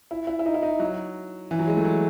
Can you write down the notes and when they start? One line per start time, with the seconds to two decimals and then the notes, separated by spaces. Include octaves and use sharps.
0.11 E4
0.27 E4
0.39 E4
0.46 D#4
0.54 E4
0.63 D#4
0.80 F#3
1.51 E3
1.59 F#3
1.68 G#3
1.77 A3
1.85 F#3